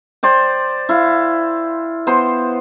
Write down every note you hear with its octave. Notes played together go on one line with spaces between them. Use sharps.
C5 D5 G5
E4 F5
B3 C5 C6